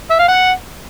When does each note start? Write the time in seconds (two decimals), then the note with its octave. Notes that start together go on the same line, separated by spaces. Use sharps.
0.11 E5
0.19 F5
0.29 F#5